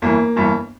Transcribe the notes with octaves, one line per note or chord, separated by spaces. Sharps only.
G1 G2 E3 A#3
G1 G2 E3